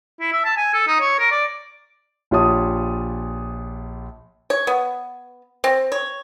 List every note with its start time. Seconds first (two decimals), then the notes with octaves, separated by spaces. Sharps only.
0.20 E4
0.32 E5
0.45 A5
0.57 G#5
0.73 A4
0.87 D#4
1.00 C#5
1.19 A#4
1.31 D5
2.31 A#1 F4 G4 C#5 A5 D#6
4.50 C#5
4.67 B3
5.64 C4
5.92 C#5